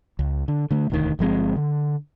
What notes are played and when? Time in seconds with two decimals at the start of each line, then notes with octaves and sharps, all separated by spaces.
0.19 C#2
0.48 D3
0.71 D3 A3
0.90 E1 D2 D#3
1.19 G1 F3 G#3 C4
1.56 D3